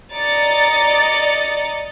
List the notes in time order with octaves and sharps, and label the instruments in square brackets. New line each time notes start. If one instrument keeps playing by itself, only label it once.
[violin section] D5 D#5 A#5 A6 C#7